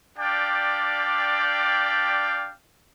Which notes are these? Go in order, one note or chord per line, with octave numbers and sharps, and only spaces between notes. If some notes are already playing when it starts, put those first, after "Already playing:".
D4 G4 D5 F5 G5